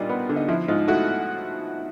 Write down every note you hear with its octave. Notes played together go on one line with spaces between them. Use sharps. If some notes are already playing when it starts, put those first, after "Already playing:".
Already playing: A#2 G3 D4 D#4 F4
B3
D3
D#4
F3 E4
G#2 D#4 F4
A3 E4 F#4